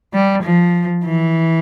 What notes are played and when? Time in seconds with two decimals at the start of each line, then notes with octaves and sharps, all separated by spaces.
0.14 G3
0.43 F3
1.04 E3